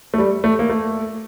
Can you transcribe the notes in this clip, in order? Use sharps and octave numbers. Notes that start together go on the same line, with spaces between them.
A3
G3
A3
A#3
A3